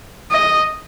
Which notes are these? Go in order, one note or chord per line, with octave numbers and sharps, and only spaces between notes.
D#5